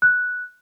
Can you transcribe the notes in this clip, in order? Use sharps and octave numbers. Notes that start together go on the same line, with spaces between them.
F#6